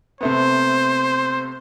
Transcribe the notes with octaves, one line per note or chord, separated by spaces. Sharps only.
C3 A3 B3 C5